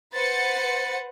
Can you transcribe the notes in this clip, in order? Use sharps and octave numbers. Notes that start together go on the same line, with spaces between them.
B4 C5 F#5 A6 C#7